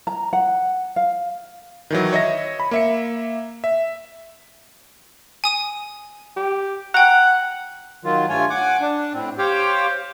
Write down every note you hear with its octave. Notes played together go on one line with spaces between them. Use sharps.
A#5
F#5
F5
D#3 E3 F#3
C#5 D#5 E5 A#6
B5
A#3 E5 C#7
E5
G#5 D#6 D#7
G4
F#5 G5 A#5
D#3 F#3 F4
G2 A3 F4 C#5 G#5
F#5 G#5 D6
D4
A2 C4
G4 C5 C#5 F5 G5